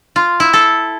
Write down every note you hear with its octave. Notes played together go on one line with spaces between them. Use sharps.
F4
E4
A4